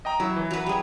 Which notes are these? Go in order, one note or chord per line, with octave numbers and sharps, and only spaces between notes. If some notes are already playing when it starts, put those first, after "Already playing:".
D#5 G5 A#5
F#3 E4
E3
F#3 B4
G3 G#4